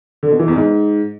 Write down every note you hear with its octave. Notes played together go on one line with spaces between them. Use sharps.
D3
B2
E3
E2
G#2